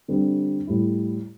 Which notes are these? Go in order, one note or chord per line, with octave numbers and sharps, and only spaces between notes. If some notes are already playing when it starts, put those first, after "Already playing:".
D3 G3 C4
A2 G3 E4